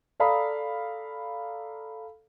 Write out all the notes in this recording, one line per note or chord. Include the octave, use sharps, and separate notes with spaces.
A4 D5 F5 A#5 B5 D#6